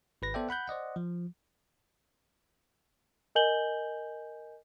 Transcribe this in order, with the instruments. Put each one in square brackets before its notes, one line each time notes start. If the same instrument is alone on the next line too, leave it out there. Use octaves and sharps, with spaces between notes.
[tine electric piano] G#1 B4 A#6
B3 A4 C5 D5 E5 G5
F#5 B5 F#6 G6
C5 D5 D#5 F#5
F3
[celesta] A#4 D#5 G#5 G6 F#7 G7